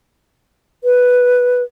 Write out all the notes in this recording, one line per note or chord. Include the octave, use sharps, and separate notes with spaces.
B4